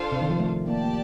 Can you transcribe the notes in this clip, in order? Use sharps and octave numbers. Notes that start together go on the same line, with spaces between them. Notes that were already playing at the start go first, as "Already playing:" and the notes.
Already playing: D4 F4 A4 C5 F5
C3
D#3
F3
A3
A#3 G4 D5 A5
A#3